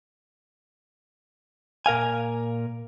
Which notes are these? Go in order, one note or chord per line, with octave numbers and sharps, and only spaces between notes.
A#2 A#4 F5 G#5